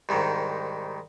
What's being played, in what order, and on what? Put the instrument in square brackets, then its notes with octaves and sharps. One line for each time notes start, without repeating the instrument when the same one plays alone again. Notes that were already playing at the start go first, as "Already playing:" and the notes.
[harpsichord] C2 G#2 D#3